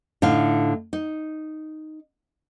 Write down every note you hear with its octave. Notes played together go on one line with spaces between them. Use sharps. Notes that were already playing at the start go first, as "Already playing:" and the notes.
A2 D3 D#4 F5
D#4